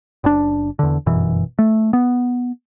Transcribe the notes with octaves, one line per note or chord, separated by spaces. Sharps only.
F#1 D4
E2 D3
G1 F#2 B2 E3
A3
B3